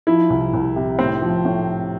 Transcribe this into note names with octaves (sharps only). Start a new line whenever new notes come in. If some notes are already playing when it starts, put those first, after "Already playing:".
F3 E4
C2
C2
C3
A2 C4
F3
A2